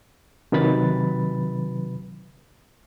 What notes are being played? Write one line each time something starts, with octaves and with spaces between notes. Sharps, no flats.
C3 D#3 F#3 B4 B5 A6